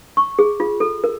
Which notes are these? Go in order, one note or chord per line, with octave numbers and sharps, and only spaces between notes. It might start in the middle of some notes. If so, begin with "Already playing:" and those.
C#6
G#4
F4
A4
A#4